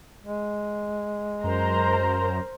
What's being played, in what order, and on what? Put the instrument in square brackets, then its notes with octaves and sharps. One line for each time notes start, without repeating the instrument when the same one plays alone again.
[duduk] G#3
[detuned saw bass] F#2 [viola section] A#4 C5 A#5